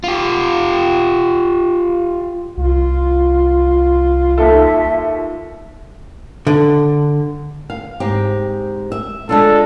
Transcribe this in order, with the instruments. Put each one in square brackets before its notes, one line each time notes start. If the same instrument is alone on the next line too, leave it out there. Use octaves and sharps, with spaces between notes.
[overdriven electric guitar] F4 G4
[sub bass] C2 [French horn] F4
[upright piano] D#2 A4 [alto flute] E5
[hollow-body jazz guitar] D3
[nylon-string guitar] F5
G#2 C4 G4
E5
[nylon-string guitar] G#3 D4 F4 [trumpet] A4